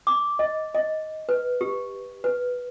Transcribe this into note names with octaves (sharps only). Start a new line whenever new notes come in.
D6
D#5
D#5
B4
G4
B4